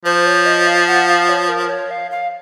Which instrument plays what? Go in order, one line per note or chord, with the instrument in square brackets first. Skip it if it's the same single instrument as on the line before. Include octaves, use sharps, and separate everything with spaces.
[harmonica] F3 [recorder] C5
[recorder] C#5
D#5
F5
F#5
F5
C#5
A#4
C#5
F5
F5